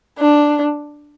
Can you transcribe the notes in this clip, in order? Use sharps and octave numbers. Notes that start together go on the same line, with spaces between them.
D4